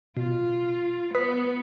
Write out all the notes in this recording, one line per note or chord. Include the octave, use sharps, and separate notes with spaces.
B2 F4
B3 B4 D#6 B6